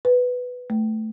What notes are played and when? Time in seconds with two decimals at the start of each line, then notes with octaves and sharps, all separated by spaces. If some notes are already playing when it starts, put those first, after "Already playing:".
0.05 B4
0.70 A3